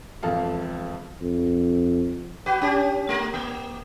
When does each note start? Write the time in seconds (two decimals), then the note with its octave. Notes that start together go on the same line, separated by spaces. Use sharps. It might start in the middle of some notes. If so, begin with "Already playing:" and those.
0.23 E1 F2 A4 F5
1.22 F2
2.46 F#4 B4
2.61 C#4 G4
3.09 A3 A#4
3.34 A#3